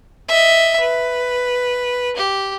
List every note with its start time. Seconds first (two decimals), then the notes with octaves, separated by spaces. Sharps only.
0.29 D#5 E5
0.80 B4
2.16 G4